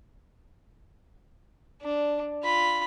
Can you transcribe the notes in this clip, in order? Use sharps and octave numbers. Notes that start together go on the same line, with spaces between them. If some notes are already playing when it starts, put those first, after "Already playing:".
D4
F4 B5